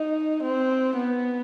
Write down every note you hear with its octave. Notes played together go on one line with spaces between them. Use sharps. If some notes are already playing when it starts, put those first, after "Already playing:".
Already playing: D#4
C4
B3